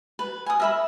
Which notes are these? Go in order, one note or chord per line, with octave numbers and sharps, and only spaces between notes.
B4
G#5 D#6
A#4 E5 B5